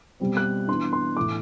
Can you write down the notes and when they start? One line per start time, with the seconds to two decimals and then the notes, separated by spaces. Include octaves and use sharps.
0.20 B2 G3 C4
0.37 F#6
0.68 E3 B3 D4 C6
0.93 C6
1.17 A2 E3 A3 E4 D6